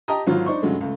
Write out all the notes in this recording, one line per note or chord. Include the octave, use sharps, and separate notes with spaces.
G4 D#5 G5 A5 A#5 D#6
G#1 F#3 F4
D4 D#4 C5 C#6
G2 C#3 F#3 G#3 A3
C#2 A3